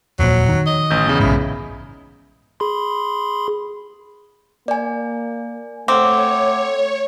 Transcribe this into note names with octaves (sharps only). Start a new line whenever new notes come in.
D#1 F2 A#2 F#3
D#3
D#5
A1 D#6 G6
E2 C#3
A#1 G#2 E4
G#4 B5 C6
A#3 D5 G#5
A3 C4 C#5 F#5 D6